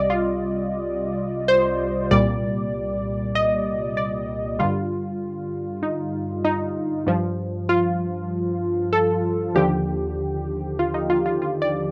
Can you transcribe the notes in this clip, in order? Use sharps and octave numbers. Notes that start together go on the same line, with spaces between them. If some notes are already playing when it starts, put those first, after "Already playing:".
Already playing: C2 C3 G3 D5 D#5
F4
C5
C2 A#2 G3 D5
D#5
D5
G2 D3 G3 F4
D#4
D#4
G2 F3
F4
A4
D#2 D3 F3 G4
F4
D#4
F4
F4
F4
D5